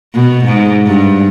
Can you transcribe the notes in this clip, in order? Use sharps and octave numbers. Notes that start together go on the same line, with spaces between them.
B2
G#2
G2